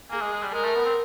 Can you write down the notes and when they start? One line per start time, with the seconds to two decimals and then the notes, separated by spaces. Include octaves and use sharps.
0.11 A#3 G#4
0.21 G#3
0.32 G#3
0.43 G3
0.54 G#3 A#4
0.64 A3
0.76 B3
0.85 C4